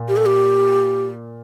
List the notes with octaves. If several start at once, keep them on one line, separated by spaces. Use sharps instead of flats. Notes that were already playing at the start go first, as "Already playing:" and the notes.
Already playing: A#2
G4
A4
G4